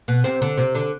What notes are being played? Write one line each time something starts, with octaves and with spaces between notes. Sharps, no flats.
B2 B3
C3 C4
D3 D4
C3 C4
D3 D4